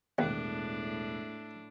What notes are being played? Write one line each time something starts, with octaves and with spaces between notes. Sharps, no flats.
E1 D#2 A2 D4 F#6